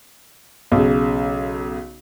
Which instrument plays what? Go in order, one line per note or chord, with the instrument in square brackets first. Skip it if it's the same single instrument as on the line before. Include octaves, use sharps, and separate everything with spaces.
[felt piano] B1 C#3